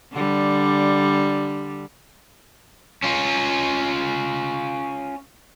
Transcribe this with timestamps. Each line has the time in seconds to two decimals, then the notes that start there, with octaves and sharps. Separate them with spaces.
0.12 D3 G3
3.03 C#4 F4